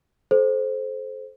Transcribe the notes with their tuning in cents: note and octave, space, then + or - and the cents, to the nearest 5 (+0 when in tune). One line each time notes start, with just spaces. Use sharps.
A4 -35 C5 +0